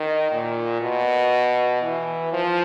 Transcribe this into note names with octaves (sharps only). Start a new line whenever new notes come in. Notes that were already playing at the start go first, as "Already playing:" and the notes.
Already playing: D#3
A#2
B2
E3
F3